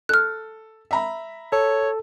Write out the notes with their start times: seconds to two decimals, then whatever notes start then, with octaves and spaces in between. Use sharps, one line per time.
0.09 A4 F6 F#6
0.91 E5 A#5 B5
1.52 A4 C#5